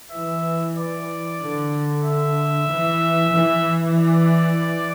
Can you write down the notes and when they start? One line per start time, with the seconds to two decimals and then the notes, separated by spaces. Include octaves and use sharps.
0.11 E3 E5
0.76 D5
1.41 D3
2.05 E5
2.68 E3
3.32 E3
3.96 D5